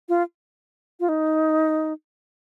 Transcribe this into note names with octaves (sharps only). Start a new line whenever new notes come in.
F4
F4
D#4